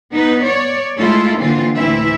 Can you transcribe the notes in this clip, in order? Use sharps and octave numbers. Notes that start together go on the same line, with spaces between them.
B3 D#4 B4
C#5 D5
G#3 A3 E4 F4 A4
D3 E3 A#3 C4 F4
D2 A2 E3 C4 E4 E5